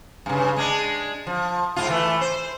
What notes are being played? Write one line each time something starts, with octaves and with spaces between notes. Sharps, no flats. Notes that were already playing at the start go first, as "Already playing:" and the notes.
G2 C#3
G#3 D4
F3
G#2 F4
E3 A3
C5